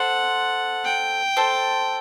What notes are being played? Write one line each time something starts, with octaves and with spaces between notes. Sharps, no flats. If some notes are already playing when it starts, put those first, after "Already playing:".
Already playing: A4 C5 F#5
G5
A4 C5